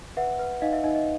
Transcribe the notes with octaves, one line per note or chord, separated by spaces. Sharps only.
B4 E5 F#5
B4
D#4 D#5 F5
E5
D#4 D#5
D#5